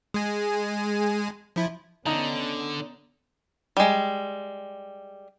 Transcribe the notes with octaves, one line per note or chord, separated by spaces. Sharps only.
G#3 G#5
F3 E4
D3 B3 C#4 D#4
G3 G#3